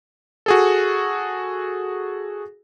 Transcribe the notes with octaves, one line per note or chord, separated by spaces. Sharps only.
F#4 G#4 A4